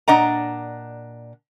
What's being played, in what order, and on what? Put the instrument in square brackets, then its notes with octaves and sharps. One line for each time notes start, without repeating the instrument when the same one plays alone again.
[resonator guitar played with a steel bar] A#2 D4 D#5 F#5 A#5